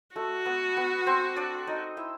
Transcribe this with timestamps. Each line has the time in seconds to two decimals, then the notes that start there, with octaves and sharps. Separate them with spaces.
0.16 A3 F#4 A4
0.45 B3 B4
0.77 B3 B4
1.06 C4 C5
1.36 D4 D5
1.67 D#4 D#5
1.97 E4 E5